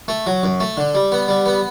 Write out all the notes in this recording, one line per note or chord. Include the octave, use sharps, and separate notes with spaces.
A3
F#3
F#2
A3
D3
G3
B3
G3
B3